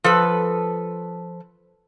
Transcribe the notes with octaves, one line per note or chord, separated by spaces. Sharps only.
F3 A4 B4